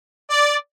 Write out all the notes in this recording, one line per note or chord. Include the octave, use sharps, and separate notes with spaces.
D5